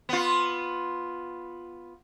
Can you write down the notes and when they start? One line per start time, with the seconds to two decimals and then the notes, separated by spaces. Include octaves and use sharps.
0.09 B3 F4